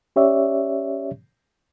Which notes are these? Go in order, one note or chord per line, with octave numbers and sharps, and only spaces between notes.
C#4 G4 C#5 D5 E5